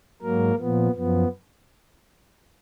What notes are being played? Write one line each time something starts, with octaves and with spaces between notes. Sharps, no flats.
G#2 F#3 A#3 A#4
A#2 F3 B3
F#2 F3 B3